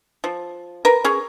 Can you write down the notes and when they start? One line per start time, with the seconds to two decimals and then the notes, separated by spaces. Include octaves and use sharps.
0.24 F3
0.85 A#4 B4
1.04 C#4 G#4